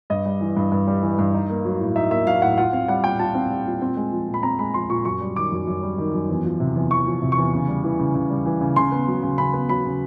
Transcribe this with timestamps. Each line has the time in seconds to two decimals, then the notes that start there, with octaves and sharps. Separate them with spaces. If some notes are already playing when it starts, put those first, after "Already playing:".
0.10 G2 D#5
0.25 G3
0.41 E3
0.56 G2
0.72 G2
0.87 G3
1.03 E3
1.18 G2
1.34 D#4
1.50 A#3
1.65 F#3
1.80 A2
1.96 D#4 E5
2.11 A#3 E5
2.27 F#3 F5
2.42 A2 F#5
2.58 F4 F#5
2.73 C4 F5
2.88 G3 F#5
3.04 A#2 G5
3.19 F4 A5
3.35 C4
3.50 G3
3.66 A#2
3.82 C4
3.97 G#3
4.12 F3
4.28 A#2
4.34 B5
4.43 C4 A#5
4.59 G#3 B5
4.74 F3 C6
4.89 A#2 C#6
5.05 F#2 C#6
5.21 G3
5.36 D#3 D6
5.52 F#2
5.67 F#2
5.82 G3
5.98 D#3
6.13 F#2
6.29 E2
6.44 F3
6.60 C3
6.75 E2
6.91 E2 C#6
7.06 F3
7.22 C3
7.32 C#6
7.38 E2
7.53 C#3
7.68 G3
7.84 E3
7.99 C#3
8.15 C#3
8.30 G3
8.45 E3
8.61 C#3
8.76 C#3 C6
8.92 B3
9.08 F#3
9.23 C#3
9.38 C#3 B5
9.53 B3
9.69 F#3 B5
9.85 C#3